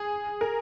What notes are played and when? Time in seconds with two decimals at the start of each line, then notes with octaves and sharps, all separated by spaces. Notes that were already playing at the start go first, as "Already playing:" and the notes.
Already playing: G#4
0.41 A#4